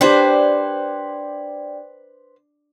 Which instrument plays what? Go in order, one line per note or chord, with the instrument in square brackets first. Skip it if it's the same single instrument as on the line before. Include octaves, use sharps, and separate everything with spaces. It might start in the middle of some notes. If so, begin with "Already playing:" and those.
[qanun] D4 G4 [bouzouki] B4 C5 [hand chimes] D5 G5